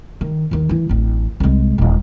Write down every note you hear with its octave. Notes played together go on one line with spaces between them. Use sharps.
D#3
D#2 D#3
E3 E4
D1 A1
C2 G#3
D#1 G#3